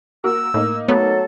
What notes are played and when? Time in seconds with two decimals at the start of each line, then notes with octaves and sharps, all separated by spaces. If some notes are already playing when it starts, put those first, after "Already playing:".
0.24 A#3 F#4 A#4 E6
0.54 A2 A#3 D#4
0.88 F#3 A3 B3 A4